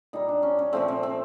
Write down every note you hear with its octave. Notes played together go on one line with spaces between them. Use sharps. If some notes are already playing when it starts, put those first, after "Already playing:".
A#2 G3 D#4
D4
C#4
C#4
A#2 F3 A3 C4
C4
C4